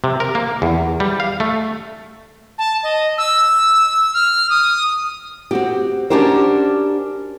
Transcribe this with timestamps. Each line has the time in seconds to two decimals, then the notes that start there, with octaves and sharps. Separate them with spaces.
0.04 C3
0.20 A#4
0.35 A#3
0.62 E2
1.00 G3
1.20 F5
1.40 A3
2.58 A5
2.83 D#5
3.18 E6
4.14 F6
4.50 D#6
5.51 C4 F#4 G4
6.10 C#4 D4 F#4 G4 A#4 C5